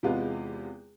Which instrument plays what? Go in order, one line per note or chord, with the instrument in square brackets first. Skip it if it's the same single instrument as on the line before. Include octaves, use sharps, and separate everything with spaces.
[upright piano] E2 C3 G#3 B3 F4